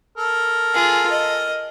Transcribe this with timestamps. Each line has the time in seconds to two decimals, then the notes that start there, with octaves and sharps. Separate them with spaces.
0.17 A4 A#4
0.74 F4 G#4
1.10 D#5